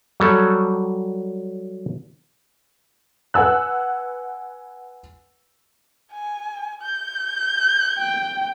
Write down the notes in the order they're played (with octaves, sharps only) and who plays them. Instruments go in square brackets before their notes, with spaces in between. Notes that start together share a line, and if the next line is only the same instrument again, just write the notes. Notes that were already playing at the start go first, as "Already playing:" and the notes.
[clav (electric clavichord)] F#3 G3 A4
[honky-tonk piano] B4 F#5 G#5 E6 F#6
[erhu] G#5
G6
[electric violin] G5